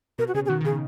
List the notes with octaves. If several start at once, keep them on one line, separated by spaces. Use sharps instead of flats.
B2 A#4
F#4
C#3 G#4
G#4
D#3 F#4
D#3
C#3 G#4